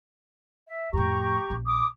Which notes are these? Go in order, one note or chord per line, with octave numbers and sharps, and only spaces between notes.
E5
F2 A2 G4 A#5 C#6
A#1 C#4
D6 D#6